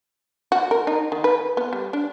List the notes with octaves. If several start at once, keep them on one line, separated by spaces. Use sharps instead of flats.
F#4
A#4
D#4
D#3
B4
B3
G3
D4